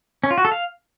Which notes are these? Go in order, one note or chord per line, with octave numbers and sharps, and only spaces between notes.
C#4
F4
F#4
A4
F5